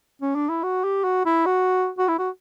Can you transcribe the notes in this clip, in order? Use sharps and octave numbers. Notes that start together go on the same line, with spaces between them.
C#4
D4
E4
F#4
G4
F#4
E4
F#4
F#4
E4
F#4